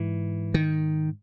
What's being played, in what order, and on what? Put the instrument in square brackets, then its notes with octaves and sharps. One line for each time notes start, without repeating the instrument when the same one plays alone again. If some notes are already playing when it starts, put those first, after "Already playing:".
Already playing: [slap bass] G#2 E3
D#3